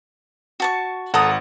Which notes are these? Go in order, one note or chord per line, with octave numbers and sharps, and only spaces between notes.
F#4 A5 C#6
G#1 A4 F#5 A#5 D#6